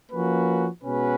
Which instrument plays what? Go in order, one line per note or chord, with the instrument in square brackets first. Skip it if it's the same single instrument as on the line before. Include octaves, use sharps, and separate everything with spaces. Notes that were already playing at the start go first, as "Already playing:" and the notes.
[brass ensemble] F3 A#3 C#4 F#4 B4
B2 G#3 C#4 F#4 B4